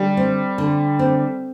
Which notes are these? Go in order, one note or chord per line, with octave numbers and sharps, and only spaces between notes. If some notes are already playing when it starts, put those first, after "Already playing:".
Already playing: D3 G3
C4
D3
C4